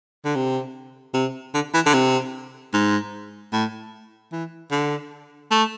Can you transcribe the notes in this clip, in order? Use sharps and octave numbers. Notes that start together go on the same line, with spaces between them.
D3
C3
C3
D3
E3
D3
C3
G#2
A2
E3
D3
A3